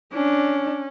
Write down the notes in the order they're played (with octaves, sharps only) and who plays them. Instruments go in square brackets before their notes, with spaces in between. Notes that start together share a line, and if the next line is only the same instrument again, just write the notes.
[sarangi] C#4 [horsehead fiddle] D4